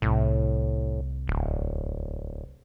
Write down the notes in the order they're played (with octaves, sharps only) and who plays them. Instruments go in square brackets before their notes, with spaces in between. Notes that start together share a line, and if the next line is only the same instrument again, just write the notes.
[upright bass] C2 [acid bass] A2
[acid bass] D1